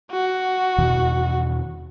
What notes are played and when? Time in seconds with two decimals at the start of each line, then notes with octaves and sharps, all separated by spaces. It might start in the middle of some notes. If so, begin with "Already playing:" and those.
0.11 F#4
0.78 E2 B2 D#3